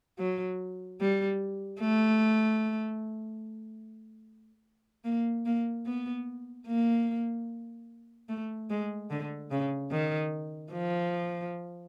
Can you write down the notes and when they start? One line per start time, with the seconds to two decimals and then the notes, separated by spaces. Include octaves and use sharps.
0.19 F#3
1.01 G3
1.81 A3
5.05 A#3
5.46 A#3
5.86 B3
6.67 A#3
8.29 A3
8.70 G#3
9.10 D3
9.51 C#3
9.91 D#3
10.73 F3